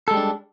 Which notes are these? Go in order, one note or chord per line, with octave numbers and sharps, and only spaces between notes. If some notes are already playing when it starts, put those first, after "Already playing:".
G3 G#3 D4 A4